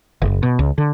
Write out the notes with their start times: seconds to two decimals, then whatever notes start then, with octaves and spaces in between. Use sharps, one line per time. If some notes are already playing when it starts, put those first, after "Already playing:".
0.22 F#1
0.43 B2
0.59 C#2
0.78 D3